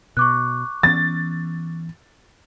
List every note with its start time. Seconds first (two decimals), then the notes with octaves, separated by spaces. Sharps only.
0.17 B2 C#6 D6 F#6
0.83 E3 B3 C#4 A6